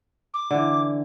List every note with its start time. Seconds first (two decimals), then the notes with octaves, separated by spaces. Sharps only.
0.34 D6
0.51 D3 E3